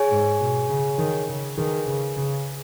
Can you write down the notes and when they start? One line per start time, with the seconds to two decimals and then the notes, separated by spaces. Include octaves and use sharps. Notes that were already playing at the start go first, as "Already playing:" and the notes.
Already playing: G#4 C#5 G#5
0.11 G#2
0.40 B2
0.69 C#3
0.98 D#3
1.28 C#3
1.57 D#3 G#4 B4 G#5
1.86 C#3
2.16 C#3